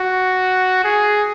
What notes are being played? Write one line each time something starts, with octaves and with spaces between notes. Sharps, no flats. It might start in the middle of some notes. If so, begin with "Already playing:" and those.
Already playing: F#4
G#4